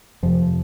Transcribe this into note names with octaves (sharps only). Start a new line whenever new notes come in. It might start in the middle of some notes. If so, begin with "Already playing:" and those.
F2 C3 F3